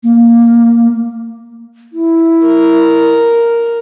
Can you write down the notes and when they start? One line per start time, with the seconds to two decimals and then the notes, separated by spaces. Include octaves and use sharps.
0.03 A#3
1.93 E4
2.45 A#4